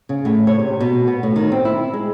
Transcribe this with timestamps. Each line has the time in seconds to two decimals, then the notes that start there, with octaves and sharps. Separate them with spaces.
0.09 C#3
0.25 A2
0.47 C#5
0.59 C3
0.81 B2
1.07 B3
1.23 A2
1.36 D#3
1.52 C4
1.65 E4
1.94 G#3